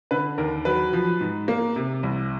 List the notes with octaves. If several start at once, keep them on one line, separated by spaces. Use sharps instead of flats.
D3 B4
D#2 A#4
F#3 B4
F3
G#2
A#3
C3
C2